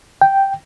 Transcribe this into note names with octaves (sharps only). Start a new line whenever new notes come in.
G5